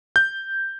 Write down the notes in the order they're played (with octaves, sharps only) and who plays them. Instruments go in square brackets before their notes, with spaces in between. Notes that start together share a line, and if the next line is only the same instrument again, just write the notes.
[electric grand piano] G6